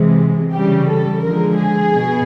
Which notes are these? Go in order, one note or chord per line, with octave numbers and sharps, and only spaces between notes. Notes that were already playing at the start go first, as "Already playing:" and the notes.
Already playing: C3 E3 G#3
C#3 E3 G3 G4
A4
D3 F3 G#3 A#4
G#4
B2